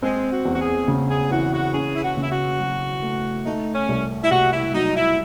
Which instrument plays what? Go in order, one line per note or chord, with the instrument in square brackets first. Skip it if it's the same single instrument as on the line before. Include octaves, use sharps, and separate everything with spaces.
[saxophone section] G#3 [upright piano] C4
[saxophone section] F#4
[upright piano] E2
[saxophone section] F#4
G#4
[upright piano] C#3
[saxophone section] G#4
[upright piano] E3 [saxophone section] F#4
[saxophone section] F#4
[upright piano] C#4 [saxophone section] G#4
[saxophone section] E4
F#4
[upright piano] C#3
[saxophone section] E4
F#4
[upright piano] F#3
A3
[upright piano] A3 [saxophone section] D#4
[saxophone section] C#4
[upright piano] C2
[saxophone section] E4
[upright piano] C3 [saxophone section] F#4
[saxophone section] E4
[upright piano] F#3 [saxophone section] D#4
[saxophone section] E4